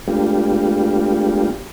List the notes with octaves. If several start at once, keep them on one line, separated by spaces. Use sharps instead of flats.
G#3 A3 B3 D4 F4 G4